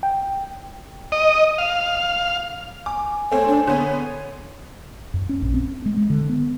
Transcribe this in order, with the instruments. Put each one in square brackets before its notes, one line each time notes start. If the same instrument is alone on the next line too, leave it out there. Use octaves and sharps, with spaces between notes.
[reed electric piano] G5
[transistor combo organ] D#5
F5
[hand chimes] G#5 [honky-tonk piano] D6
[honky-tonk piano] A3 C4 [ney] C#5 [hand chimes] G#5
[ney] D4
[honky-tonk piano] D3 B3 [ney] C#5
[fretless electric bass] F#2
C#4
A#1
C4
G#3
G#3
D3
B3